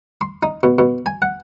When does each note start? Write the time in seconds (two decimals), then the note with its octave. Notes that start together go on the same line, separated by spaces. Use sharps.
0.21 C6
0.43 D#4
0.63 B2
0.79 B2
1.06 G#5
1.22 F#5